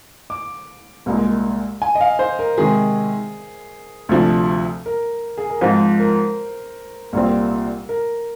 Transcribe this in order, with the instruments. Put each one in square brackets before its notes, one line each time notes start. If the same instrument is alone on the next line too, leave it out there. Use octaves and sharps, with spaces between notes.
[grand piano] D6
[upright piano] C2 A#2 G#3
[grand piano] G#5
D#5
F5
C5
A#4
[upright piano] C3 D#3 G#3 [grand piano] G#4
[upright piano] D2 C3 F3
[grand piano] A#4
G#4
A#4
[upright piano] G#2 F3 C4 F4 [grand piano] C5
[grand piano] A#4
[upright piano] C2 A#2 G3 C4 F4
[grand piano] A#4